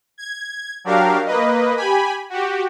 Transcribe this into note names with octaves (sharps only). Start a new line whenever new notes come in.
G#6
F#3 D4 F#4 G4 A#4 F5
A#3 B4 D#5
G4 G#5 B5
F#4 G4